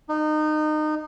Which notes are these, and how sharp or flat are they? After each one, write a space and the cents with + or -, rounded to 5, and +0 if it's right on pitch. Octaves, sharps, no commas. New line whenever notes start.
D#4 -25